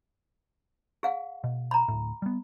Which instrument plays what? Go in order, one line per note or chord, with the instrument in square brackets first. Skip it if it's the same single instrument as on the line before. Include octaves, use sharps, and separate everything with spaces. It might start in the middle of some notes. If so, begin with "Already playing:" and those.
[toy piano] G#4 F5 F#5
[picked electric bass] B2
[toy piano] A#5 B5
[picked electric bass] D1 A2
G3 B3